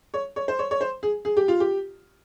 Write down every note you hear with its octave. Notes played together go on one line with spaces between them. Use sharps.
C#5
C#5
C5
C#5
C#5
C5
G#4
G#4
G4
F4
G4